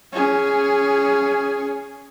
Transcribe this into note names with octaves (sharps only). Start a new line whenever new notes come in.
C#4 G#4